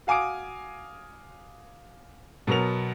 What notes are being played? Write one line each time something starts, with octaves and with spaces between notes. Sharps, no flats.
F#4 F5 G#5 D6 D#6 D7
B2 F#3 B3 A#4 F7